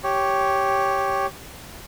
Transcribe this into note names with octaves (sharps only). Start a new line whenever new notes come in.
G4 C#5